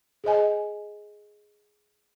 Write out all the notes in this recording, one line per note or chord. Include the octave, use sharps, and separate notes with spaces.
G#4 C5 D#5 G#5